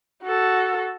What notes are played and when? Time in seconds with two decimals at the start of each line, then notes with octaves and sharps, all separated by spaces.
0.23 F#4 A4